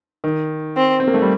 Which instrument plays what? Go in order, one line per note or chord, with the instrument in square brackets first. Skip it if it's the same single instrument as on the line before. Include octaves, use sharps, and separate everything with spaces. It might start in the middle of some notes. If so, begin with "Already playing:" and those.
[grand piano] D#3
[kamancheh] C4
[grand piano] C4
A#3
A3
G3